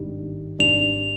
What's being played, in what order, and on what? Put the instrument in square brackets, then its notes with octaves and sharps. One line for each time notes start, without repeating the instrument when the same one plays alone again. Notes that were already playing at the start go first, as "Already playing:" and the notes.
Already playing: [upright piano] G#1 G2 D#3 G3
[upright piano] G#1 G#2 G3 D4 [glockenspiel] F7